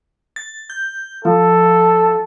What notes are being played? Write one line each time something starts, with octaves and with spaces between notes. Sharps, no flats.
A6
G6
F3 A4